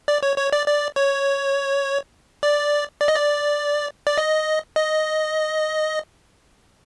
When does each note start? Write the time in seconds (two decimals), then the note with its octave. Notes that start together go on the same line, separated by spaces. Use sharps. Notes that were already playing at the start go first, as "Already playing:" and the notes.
0.08 D5
0.23 C#5
0.38 C#5
0.53 D5
0.67 D5
0.96 C#5
2.43 D5
3.01 D5
3.08 D#5
3.15 D5
4.07 D5
4.18 D#5
4.76 D#5